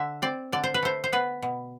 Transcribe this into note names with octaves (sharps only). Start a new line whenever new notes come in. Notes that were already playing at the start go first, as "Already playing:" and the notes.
Already playing: D3 E5
C4 D5
D3 D5
C5
B4
A3 C5
C5
B3 B4
B2